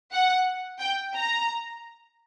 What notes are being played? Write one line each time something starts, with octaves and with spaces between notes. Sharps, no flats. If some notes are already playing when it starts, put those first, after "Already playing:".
F#5
G5
A#5